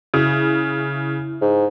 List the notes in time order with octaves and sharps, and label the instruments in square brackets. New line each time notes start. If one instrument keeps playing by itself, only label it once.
[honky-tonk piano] C#3 [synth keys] E4
[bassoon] G#2